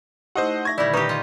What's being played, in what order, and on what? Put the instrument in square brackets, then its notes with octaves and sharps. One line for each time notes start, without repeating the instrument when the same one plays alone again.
[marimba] A3 D#4 E4 [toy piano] G4 D#6 [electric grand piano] C5 D#5 F#5
[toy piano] E5 C#6 [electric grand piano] G#6 A#6
[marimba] A#2 D3 D#3 [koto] G3 E4 [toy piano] D5
[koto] D#4 G4 [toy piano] B4 A#5 C#6
[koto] D#4 F4 D#5